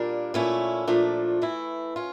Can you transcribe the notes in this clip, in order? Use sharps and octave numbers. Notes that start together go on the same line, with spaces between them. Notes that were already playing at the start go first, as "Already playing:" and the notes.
Already playing: A#2 G3 A#3 D4
A#2 A3 C#4 E4
A#2 F3 A3 D4
E3 A3 E4
C#4 F4